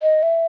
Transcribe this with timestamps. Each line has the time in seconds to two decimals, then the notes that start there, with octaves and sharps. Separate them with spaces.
0.03 D#5
0.23 E5